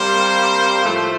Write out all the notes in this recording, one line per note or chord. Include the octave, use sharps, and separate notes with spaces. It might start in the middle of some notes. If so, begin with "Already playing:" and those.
Already playing: C3 G3 A#3 C5
A2 F3 A3